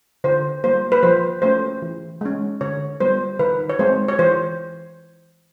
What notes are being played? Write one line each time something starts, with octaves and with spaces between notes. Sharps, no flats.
D3 C5
G3 A#3 C5
B4
F3 C5
A3 C#4 C5
E3
G#3 C#4
D3 C#5
G3 B3 C5
D#3 B4
C#5
G#3 C4 C5
C#5
E3 C5